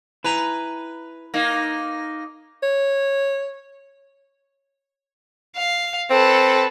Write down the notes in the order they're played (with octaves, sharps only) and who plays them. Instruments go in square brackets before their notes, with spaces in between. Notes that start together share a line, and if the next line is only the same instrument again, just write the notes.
[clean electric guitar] E4 G#5 A#5 [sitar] B4
[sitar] A#3 D#4
[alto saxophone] C#5
[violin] F5
[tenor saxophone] C4 [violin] A4 B4